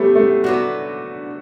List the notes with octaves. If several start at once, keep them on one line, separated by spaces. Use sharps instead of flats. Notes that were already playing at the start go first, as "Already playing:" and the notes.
Already playing: F#3 A3 B3 C#4 E4 G4
A3
D3 F#3 B3 F#4